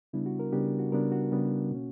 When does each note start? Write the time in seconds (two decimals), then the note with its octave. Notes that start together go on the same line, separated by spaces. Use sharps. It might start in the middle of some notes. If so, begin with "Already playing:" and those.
0.13 C#3 G3 B3 D4 E4
0.26 F#4
0.40 A#4
0.52 C#3 G3 B3 D4 G4
0.79 F#4
0.92 C#3 G3 B3 D4 A#4
1.12 F#4
1.32 C#3 G3 B3 D4
1.71 B2 A#3 C#4